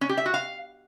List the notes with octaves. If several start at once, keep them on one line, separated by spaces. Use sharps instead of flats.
C#4
G4
E5
F#4
F5